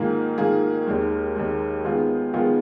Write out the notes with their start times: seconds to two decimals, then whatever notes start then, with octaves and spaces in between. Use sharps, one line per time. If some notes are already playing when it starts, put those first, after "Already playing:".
Already playing: G#2 D#3 A#3 F4 G#4
0.38 G#2 D#3 A#3 F4 G#4
0.87 D#2 D#3 G#3
1.35 D#2 D#3 G#3
1.84 D#3 G#3 B3 F4 G#4
2.33 D#3 G#3 B3 F4 G#4